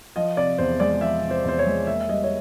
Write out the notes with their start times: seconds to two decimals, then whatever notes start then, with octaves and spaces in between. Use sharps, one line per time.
0.16 F3 D#5
0.37 C3 D5
0.58 E2 C5
0.80 G#3 D5
1.01 F3 E5
1.23 C3
1.31 C5
1.44 E2 C5
1.59 C#5
1.66 G#3
1.87 A#3 E5
2.01 E5
2.09 G3 D#5
2.24 C#5